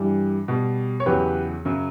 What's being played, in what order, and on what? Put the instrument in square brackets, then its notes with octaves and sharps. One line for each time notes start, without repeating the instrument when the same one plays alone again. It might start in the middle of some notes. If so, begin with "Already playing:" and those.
Already playing: [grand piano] G2 E3 G3
B2 G3
C#5
E2 C#3 F#3 G4 B4
F#2 C#3 F#3